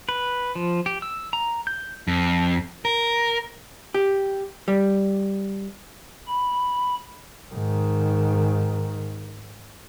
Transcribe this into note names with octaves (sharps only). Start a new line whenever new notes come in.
B4
F3
G4
E6
A#5
G6
F2
A#4
G4
G3
B5
G#2 D#3